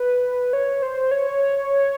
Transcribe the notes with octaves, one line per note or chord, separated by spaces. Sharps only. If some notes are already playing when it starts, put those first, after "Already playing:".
Already playing: B4
C#5
C5
C#5